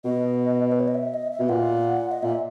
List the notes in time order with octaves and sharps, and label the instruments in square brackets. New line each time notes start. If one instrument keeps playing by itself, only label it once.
[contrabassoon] B2 [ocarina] D#5
[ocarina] B4
C#5
D#5
E5
D#5
E5
[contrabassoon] B2
[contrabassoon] A#2 [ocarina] F#5
[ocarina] D#5
[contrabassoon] A#2 [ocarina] E5